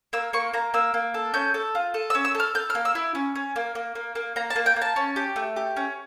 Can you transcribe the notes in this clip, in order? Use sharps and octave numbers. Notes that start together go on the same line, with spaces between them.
A#3 E6
A#3 C#6
A#3 A#5
A#3 E6
A#3
A4
C#4 G6
A4
F4
A4
E6
C#4
E6
A4
F6
A4 G6
F6
A#3
E6
E4
C#4
C#4
A#3
A#3
A#3
A#3
A#3 A#5
A5
A#3
G5
A#3
A5
C#4
G4
A3
G4
C#4